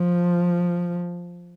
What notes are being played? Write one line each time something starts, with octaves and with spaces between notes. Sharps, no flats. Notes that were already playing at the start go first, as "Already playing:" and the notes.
Already playing: F3